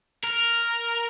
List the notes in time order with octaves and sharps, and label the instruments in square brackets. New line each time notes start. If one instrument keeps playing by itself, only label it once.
[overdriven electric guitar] A#4